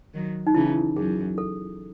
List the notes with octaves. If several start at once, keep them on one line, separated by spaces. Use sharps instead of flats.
D#3 F#3
D#4
C#3 E3 E4
F#2 G#4
A4